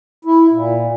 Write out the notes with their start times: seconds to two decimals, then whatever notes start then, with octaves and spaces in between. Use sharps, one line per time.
0.25 E4
0.51 A#2